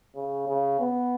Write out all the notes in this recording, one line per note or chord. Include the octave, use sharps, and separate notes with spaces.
C#3
C#3
B3